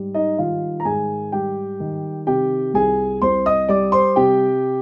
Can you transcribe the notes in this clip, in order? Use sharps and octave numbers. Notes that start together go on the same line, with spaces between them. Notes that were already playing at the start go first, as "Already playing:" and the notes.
Already playing: G#2 G3
D#4 D#5
D#3 F4 F5
A#5
G#2 G#4 G#5
G3 G4 G5
D#3
C3 G4 G5
C2 G#4 G#5
C2 C5 C6
D#5 D#6
G3 D5 D6
C5 C6
C3 G4 G5